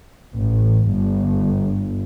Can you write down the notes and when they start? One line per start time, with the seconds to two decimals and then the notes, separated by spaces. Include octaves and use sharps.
0.33 A1
0.88 G1